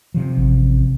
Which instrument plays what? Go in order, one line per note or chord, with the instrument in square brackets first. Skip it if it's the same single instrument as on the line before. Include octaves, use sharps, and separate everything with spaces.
[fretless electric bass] C3 F3
[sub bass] A1